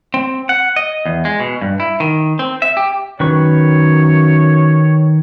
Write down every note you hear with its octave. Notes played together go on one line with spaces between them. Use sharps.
C4
F#5
D#5
E2
G#3
B2
G2
E4
D#3
C4
E5
G4
F#2 D#3 B4 C#5 C#6